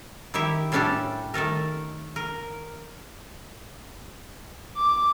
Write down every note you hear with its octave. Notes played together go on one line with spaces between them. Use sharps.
D#3 E4 G4 E5
A2 G3 C#4 D4 G4 A4
D#3 A3 A4 A#4
A#4
D6